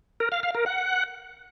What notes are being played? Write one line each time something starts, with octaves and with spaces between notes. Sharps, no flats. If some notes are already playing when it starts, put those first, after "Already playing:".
A#4
F5
F5
A#4
F#5